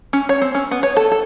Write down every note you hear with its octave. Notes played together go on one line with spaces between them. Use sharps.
C#4
C#5
C4
C#4
B3
C#5
A4
A4